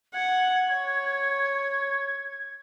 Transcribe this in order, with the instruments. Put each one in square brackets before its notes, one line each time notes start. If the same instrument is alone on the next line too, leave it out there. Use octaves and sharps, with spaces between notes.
[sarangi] F#5 [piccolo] G#6
[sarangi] C#5